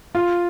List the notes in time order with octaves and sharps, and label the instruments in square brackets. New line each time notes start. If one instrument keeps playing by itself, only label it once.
[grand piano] F4